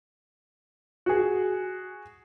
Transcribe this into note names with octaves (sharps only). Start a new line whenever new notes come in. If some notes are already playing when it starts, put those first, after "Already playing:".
F#4 G#4